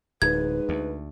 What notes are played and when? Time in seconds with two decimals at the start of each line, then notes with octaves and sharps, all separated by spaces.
0.22 D1 G#2 B4 G#6
0.69 D2